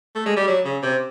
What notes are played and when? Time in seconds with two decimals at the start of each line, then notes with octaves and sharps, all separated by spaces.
0.15 A3
0.26 G#3
0.36 G3
0.47 F#3
0.65 C#3
0.83 C3